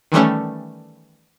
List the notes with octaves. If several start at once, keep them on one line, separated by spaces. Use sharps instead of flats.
D#3 E3 G3 A3 C#4